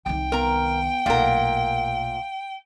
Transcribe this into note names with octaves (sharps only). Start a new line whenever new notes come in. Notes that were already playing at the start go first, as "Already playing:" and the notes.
C2 D#3 G5
B3 A#4 A#5
B1 A#2 A3 A#4 F5 F#5